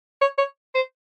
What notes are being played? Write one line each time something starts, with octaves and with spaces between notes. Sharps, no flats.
C#5
C#5
C5